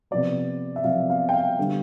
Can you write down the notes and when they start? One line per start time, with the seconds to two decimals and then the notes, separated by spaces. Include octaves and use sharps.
0.11 C3 F3 B3 D5
0.76 E5
0.84 C3 F3 B3 F5
1.10 F5
1.29 G5
1.33 F5
1.59 D3 G3 B3